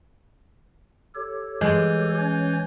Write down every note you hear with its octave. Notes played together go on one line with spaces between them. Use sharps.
G4 A4 C#5
E3 G#3 G6
C#4 C#5